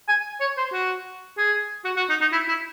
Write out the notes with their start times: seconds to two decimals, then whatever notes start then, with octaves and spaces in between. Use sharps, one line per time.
0.08 G#5
0.41 C#5
0.57 C5
0.72 F#4
1.37 G#4
1.84 F#4
1.96 F#4
2.10 D#4
2.21 D#4
2.32 E4
2.48 E4